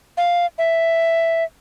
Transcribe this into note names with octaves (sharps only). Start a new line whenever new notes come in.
F5
E5